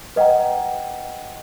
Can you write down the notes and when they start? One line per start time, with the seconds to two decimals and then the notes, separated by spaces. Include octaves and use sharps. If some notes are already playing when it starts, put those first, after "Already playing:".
0.16 B4 D#5 F#5 G5 A#5